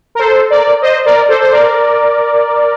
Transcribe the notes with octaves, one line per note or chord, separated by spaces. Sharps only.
A#4
A4 C5
A#4 D5
C5 D#5
A#4 D5
A4 C5
C5
A#4 D5